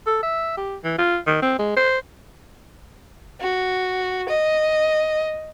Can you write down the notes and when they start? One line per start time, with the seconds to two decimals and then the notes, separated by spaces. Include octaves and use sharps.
0.07 A4
0.23 E5
0.57 G4
0.84 E3
0.98 F4
1.27 D#3
1.42 C4
1.59 G#3
1.77 C5
3.41 F#4
4.29 D#5